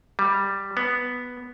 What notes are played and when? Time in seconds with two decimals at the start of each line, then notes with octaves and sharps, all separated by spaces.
0.19 G3
0.77 B3